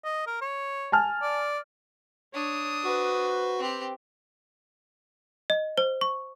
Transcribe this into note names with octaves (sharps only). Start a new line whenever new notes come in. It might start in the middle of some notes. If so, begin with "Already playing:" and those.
D#5
A#4
C#5
G#5 A5 F6
D5
D4 C#5 D#6
F#4 B4 C5
C4 G4
D#5
C5
C#6